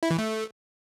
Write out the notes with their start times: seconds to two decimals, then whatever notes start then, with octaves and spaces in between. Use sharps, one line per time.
0.03 E4
0.11 E3
0.18 A3